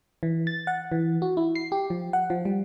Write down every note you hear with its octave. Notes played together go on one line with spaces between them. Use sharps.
E3
A6
F#5
E3
F#4
E4
C7
G4
F3
F#5
F3
G3